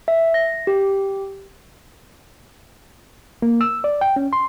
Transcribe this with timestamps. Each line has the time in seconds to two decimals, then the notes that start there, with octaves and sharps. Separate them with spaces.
0.08 E5
0.34 A#6
0.67 G4
3.42 A#3
3.61 E6
3.84 D5
4.01 G5
4.16 C#4
4.33 C6